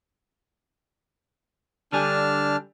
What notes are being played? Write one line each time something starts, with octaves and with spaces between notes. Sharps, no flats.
D3 G3 D4 G#5 A5 F6